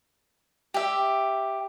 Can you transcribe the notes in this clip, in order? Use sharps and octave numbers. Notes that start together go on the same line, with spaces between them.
G4 E5